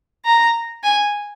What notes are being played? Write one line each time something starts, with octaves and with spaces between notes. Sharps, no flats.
A#5
G#5